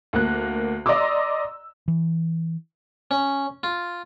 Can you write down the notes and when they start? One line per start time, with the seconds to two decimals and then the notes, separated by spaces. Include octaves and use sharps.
0.13 D2 A#3 F#6
0.86 D5 D#5 A#5 C6 D6 E6
1.88 E3
3.11 C#4
3.63 F4